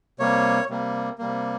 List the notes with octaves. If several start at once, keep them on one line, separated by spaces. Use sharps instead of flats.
C3 G3 A#3 C#5
C3 G3 A#3
C3 G3 A#3